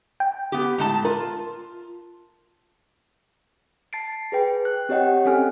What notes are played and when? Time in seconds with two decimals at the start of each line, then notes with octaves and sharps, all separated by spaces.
0.20 G5
0.52 B3 G4
0.78 A2 G#3 A5
1.05 F4 A#4
3.93 A5 A6 C7 D7
4.32 G#4 B4 G5
4.65 F#6
4.89 C4 G4 C#5 D#5 F#5 G5
5.25 C4 C#4 A4 G#5 F6